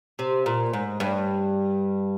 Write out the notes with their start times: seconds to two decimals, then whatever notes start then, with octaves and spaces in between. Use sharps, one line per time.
0.19 C3
0.46 A#2
0.73 G#2
1.00 G2